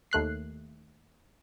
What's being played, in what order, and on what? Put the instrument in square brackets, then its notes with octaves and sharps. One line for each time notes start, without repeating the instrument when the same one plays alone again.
[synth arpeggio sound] D#2 A3 F#6 C7